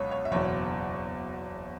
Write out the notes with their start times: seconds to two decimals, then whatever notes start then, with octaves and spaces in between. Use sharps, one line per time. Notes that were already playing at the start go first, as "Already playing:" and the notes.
Already playing: C#2 B2 F#3 B3 C#5
0.11 C#5
0.25 E5
0.32 F#1 E2 B2 C#5